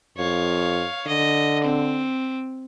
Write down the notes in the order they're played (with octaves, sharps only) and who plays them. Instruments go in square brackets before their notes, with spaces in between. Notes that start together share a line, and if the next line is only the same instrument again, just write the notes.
[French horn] F2 [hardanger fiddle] C#5 F5
[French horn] D3 [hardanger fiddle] D#5
[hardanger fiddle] C4